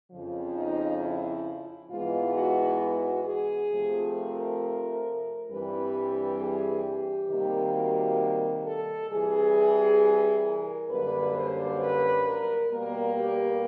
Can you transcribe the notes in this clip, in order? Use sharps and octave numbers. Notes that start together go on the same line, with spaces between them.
F2 C#3 F3
D#4
E4
G#2 E3 G#3 B3 F4
F#4
F#4
G#4
C3 F3 A3
A#4
G2 E3 G3 C4 B4
G#4
G4
C3 D#3 G3 A#3
F#4
A4
C3 E3 G3 G#4
A#4
F#2 D3 G3 A#3 B4
C5
B4
A#4
B2 G3 A#3 A#4
G4